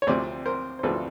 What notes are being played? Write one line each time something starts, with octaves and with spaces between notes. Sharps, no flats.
C#5
D2 C3 F3 C5 D5
A#4 C5
C5
D2 C3 F3 A4 B4